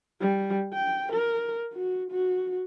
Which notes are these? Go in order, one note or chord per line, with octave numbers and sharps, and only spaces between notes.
G3
G5
A#4
F#4
F#4